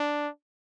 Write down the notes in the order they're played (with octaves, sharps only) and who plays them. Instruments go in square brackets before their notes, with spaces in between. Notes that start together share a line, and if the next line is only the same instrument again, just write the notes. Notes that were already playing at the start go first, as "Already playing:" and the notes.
Already playing: [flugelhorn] D4